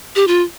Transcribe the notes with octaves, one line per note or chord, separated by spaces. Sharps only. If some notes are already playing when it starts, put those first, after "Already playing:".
G4
F4